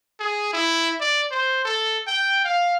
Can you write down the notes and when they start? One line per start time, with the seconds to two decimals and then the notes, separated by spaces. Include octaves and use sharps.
0.20 G#4
0.53 E4
1.00 D5
1.31 C5
1.65 A4
2.07 G5
2.44 F5